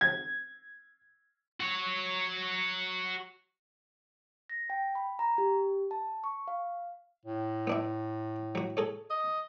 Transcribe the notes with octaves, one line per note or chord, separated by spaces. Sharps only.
G#6
F#4 C#5
A#6
G5
B5
A#5
G4
A5
C#6
F5
A2
B3 D4 E4
F#3 F#4
G#4 A4 C#5
D#5